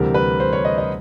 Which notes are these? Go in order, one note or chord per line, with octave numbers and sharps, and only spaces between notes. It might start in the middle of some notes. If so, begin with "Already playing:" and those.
Already playing: D2 C3 E3 G3 A#4
B4
C5
C#5
D#5
D#5